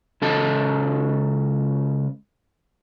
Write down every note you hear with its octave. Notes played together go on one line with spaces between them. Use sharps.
C#2 C#4 A4 D#5 A5